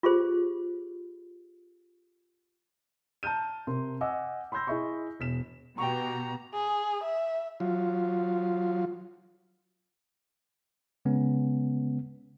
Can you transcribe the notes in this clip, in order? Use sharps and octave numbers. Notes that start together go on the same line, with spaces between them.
F4 G4 G#4 C5
A5 A#5 F6 G6 D#7
C3 A#4 C6
D#5 F#5 G#5 D6 E6
B5 C6 E6 G6 A#6
E4 G#4 D#5 E5 B5 C#6
E1 B6 E7
B2 F#4 G4 G5 A#5 C#6
G#4
E5
F#3 F4
C#3 G#3 B3 C#4